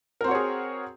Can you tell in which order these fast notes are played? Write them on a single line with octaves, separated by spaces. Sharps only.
A#4 C4 F#4 C#5 G#4